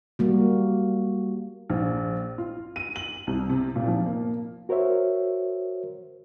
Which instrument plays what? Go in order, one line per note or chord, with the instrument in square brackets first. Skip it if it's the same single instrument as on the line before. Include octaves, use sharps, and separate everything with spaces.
[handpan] G3 A#3 F#4
[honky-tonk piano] A#1
F4
D#7
F#7
C2
C3
A#2
F3
A#3
[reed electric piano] F#4 A#4 C5 C#5 E5